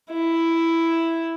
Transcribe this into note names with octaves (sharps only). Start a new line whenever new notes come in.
E4